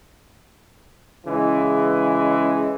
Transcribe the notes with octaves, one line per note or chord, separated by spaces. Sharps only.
C#3 E3 G#3